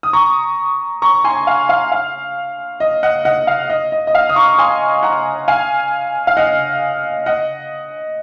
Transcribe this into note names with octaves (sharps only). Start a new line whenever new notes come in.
D#6
A#5 C#6
A#5 C#6
G#5 C6
F5
F5
F5
D#5
D#5 F#5
D#5 F#5
F5
D#5
D#5
D#5
F5
D#6
A#5 C#6
C#6
G#5 C6
F#5 A#5
F5 G#5
F5
D#5 F#5
D#5 F#5